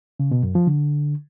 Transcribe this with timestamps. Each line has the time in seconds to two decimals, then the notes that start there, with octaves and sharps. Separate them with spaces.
0.20 C#3
0.31 B2
0.43 F#2
0.55 F3
0.67 D3